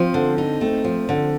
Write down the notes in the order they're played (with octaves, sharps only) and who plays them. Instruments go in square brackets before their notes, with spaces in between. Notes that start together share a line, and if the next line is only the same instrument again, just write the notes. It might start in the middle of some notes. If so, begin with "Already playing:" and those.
Already playing: [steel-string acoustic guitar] F3 [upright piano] C4
[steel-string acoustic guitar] D3
D#4
[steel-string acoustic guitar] A3 [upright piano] C4
[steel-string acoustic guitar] F3
D3